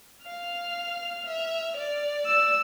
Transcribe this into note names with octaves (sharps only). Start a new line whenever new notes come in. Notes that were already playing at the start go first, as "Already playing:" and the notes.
F5 F6
E5
D5
E6